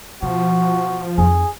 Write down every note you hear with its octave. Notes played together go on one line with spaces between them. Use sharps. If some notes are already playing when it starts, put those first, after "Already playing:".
B2 F3 F#4
F2 D#4 G#4